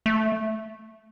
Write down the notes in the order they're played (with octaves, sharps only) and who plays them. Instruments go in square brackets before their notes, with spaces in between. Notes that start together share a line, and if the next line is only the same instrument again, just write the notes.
[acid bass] A3